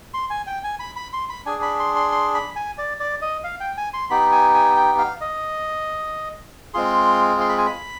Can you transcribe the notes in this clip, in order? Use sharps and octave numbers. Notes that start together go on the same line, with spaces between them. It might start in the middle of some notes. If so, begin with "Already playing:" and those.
C6
G#5
G5
G#5
B5
B5
C6
B5
D4 G#4 G#5
B5
C6
C6
C6
B5
G#5
D5
D5
D#5
F5
G5
G#5
C6
B3 D#4 G4 B5
G#5
G#5
G5
F5
D#5
G#3 C4 F4 G#4 C6
C6
B5
G#5
B5